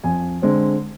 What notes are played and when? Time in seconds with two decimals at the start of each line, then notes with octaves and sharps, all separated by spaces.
0.04 F2 G#5
0.42 D3 G#3 C4